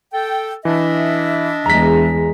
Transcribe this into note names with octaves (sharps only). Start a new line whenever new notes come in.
A4 G5
E3 D4 D#5 E5
E2 G#3 A#5 B6